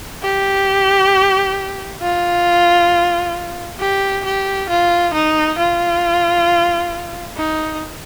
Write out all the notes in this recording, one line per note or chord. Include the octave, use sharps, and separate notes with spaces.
G4
F4
G4
G4
F4
D#4
F4
D#4